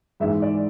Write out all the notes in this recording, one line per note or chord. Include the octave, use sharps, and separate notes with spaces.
G#2 E3 G#3 E5
D5